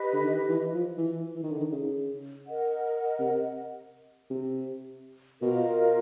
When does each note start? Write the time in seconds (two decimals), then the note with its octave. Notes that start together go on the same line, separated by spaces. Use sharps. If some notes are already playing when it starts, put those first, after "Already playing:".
Already playing: G4 B4 D#5
0.13 D3
0.24 D#3
0.49 E3
0.74 F3
0.98 E3
1.36 E3
1.43 D#3
1.51 D3
1.60 D#3
1.72 C#3
2.46 A#4 D#5 F#5
3.20 C3
4.30 C3
5.41 B2 F4 A#4 D#5